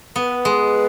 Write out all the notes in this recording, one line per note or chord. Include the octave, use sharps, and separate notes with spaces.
B3 B4
G#3